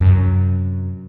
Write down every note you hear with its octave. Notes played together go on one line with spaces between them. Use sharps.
F#2 C3